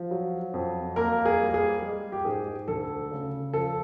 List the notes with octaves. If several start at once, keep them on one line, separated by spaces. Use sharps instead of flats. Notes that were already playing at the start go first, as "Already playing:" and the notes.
Already playing: F3
F#3
F2
A#3 A#4
G#4
G3
G#4
G#3
G4
G#2 G#4
D2 A4
C#3
F3 A4